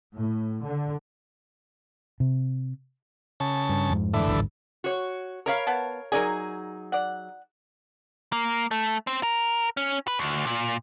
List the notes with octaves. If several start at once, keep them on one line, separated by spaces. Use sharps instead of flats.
A2
D3
C3
C#3 A5
G2
F2 G#2
A2 D3 E3
G#1 D2 G2
F#4 C#5
A#4 C#5 F5 A#5 B5
B3 A5
F#3 D#4 G#4 A#4 D5 G#5
D5 F#5
A#3
A3
C4
A#4
C#4
B4
D2
A#2